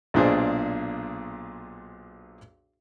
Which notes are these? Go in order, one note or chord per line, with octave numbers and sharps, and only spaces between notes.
B1 A#2 D4 G#4 C5